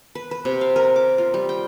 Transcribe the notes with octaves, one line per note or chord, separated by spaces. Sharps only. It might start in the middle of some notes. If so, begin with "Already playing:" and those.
B4
B4
C3
F5
A#4
D6
F4
G3
G5